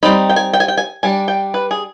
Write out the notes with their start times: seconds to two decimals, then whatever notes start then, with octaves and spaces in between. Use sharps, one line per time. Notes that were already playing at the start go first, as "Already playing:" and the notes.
0.03 G3 C4 D#4 B5
0.29 G5
0.36 G#5
0.53 G5
0.60 G#5
0.68 G5
0.77 G#5
1.03 G3 D4 G#5
1.28 G5
1.54 B4
1.71 G#4